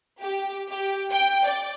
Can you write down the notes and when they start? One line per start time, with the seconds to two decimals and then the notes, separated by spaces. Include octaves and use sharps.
0.20 G4
0.71 G4
1.10 G5
1.44 D5